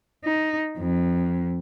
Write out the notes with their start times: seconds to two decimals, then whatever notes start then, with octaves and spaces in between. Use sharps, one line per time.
0.24 D#4
0.78 F2